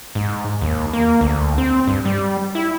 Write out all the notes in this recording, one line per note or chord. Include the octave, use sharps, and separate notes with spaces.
G#2
D#2
A#3
D2
C4
G2
G3
E4